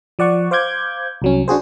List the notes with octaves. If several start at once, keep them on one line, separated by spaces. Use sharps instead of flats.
F3 D5 F#5 C#6
C5 F5 D6 G6 G#6
C2 F#3 C#4
D4 F#4 G#4 C5